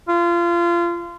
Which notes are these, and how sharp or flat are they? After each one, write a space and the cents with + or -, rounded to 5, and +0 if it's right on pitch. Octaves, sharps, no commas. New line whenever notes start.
F4 -25